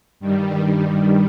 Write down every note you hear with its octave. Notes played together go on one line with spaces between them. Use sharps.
G2 D#3 G3